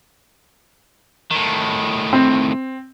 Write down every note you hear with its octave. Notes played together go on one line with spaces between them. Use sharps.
A2 D#3
C4